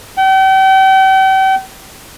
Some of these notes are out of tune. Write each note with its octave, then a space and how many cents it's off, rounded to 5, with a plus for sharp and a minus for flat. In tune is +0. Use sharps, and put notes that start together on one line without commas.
G5 -40